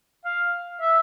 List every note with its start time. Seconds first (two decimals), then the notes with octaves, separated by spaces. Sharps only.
0.25 F5
0.81 E5